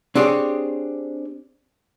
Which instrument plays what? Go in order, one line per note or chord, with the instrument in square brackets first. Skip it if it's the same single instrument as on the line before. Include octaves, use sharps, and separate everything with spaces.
[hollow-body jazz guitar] C4 D4 G4 G#4 C#5